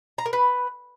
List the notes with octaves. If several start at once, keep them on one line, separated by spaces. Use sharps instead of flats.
A#5
A#4
B4